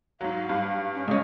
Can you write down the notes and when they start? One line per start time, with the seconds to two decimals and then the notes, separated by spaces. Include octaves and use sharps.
0.21 G#2 F#3 F5
0.49 G2
0.94 C#4
1.08 G#2 C#4 D#5